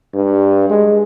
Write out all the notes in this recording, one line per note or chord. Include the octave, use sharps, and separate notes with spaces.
G2
G#3